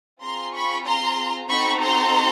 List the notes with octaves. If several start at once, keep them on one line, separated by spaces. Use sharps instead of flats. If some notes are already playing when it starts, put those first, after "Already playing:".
C4 F4 G#4 A#5 C6
B5 C#6
A#5 C6
C4 D#4 F#4 A4 B5 C#6
A#5 C6